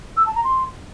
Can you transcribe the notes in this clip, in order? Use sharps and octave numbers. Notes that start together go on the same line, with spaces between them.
E6
A5
A#5
C6